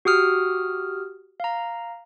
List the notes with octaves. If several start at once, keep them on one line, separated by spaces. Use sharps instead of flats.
F#4 G4 D#6 F6
F5 A#5